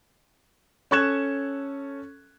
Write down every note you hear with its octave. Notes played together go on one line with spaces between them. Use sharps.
C#4 A4 C#6 F#6 G#6 E7